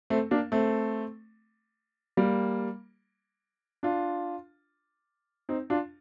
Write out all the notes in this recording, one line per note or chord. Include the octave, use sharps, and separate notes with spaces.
A3 C4
A#3 D4
A3 C4
G3 A#3
D4 F4
C4 D#4
D4 F4